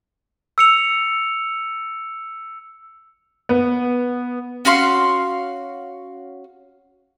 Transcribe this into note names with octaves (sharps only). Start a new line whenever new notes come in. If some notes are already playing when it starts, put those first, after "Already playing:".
E6 C#7 F7
B3
C#4 F#4 F5 C6